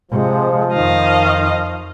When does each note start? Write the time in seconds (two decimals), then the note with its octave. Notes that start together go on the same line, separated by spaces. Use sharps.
0.11 C3 F3 G#3
0.73 F2 D#3 D#5 F5